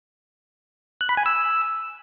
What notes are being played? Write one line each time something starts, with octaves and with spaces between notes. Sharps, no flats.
F#6
B5
G#5
E6